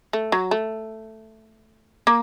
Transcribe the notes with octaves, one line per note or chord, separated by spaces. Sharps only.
A3
F#3
A3
A#3